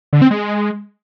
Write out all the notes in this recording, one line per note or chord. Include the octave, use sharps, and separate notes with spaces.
D3
C4
G#3